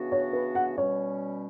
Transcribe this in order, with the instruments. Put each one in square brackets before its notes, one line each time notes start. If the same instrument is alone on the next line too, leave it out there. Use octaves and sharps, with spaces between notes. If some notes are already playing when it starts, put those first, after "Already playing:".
Already playing: [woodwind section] C#3 E3 B3 D4 F#4
[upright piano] C#5
B4
F#5
[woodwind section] B2 G3 C#4 [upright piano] C#5